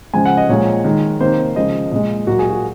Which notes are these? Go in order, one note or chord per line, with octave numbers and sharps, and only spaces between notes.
C#3 F3 G#3 G#5
F#5
D#5
A#2 F3 G#3 C#5
D#3 G#3
C3 D#3 A#3 C5
C#3 F3 G#3 D#5
A#2 G#3 D#5
A#2 F#3 A#3 F#4
G#4
F#4